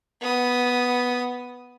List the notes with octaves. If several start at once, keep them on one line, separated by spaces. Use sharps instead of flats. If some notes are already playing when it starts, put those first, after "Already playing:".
B3 D#6